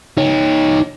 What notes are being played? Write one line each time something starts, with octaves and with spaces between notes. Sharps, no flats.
D#4 C#5